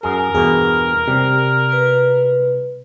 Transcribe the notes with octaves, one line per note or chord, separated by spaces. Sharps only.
F#2 G#4 A#4
E2 G2 B2 G#4
C3 G3
B4